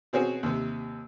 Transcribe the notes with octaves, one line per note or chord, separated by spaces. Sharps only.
B2 C4 C#4 F#4 G#4
D#2 C3